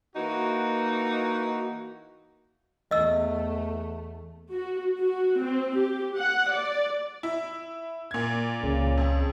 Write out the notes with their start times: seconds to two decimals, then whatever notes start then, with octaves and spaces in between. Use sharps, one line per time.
0.16 E3 A#3 D#4 F#4
2.91 E2 A3 D#5 E6
4.52 F#4
4.99 F#4
5.41 C4
5.77 G4
6.18 F#5
6.53 D5
7.23 E4
8.11 A#2 G#6
8.63 C#2 C#3
8.97 F2